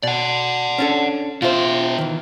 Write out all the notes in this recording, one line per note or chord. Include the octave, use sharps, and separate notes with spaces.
B2 D5 F#5
C#4 D4 A4
B2 F4 C5 E5
D#3 E3